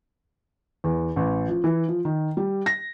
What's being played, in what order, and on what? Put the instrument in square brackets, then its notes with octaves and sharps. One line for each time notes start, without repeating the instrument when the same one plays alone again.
[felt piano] E2
A1
F3
E3
F3
D#3
G3
A#6